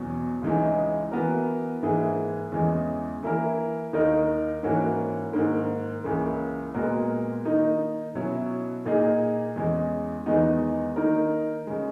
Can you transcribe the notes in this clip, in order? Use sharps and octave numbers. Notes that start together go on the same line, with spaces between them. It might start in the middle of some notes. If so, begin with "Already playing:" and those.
Already playing: E2 B2 F#3 C#4
C#2 C#3 E3 G#3 D#4
E3 B3 F#4 A#4
G#2 E3 A#3 E4 G#4
E2 C#3 E3 G#3
E3 A#3 E4 A#4
D#2 D#3 A#3 D#4 A#4
G#2 E3 A#3 C#4 F#4
G#2 D#3 A#3
C#2 C#3 E3 A#3
A#2 G#3 B3 F#4 A#4
D#3 A#3 D#4
B2 F#3 C#4 E4
A#2 A#3 D#4 G#4
E2 C#3 G#3
E2 D#3 G#3 B3 D#4
D#3 A#3 D#4 A#4
C#3 G#3